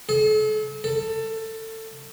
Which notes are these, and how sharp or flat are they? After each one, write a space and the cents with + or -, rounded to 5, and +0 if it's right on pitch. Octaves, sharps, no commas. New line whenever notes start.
A4 -40
A4 +20